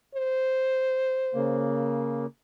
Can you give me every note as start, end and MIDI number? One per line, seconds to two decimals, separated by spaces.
0.15 1.69 72
1.35 2.26 49
1.35 2.26 58